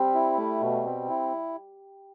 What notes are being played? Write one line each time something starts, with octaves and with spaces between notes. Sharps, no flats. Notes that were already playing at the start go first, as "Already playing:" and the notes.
Already playing: G3 C4
E4
A3
B2
C4
E4